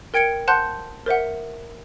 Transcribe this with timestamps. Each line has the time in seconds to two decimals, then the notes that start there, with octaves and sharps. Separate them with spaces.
0.14 A#4 G5 G#6 C#7 D7
0.47 C5 F#5 A5 C6 F#6 G6
1.06 A#4 C5 E5 F#5